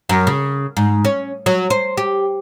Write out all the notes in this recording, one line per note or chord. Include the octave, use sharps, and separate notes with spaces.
F#2
C#3
G#2
C#4
F#3
C5
G4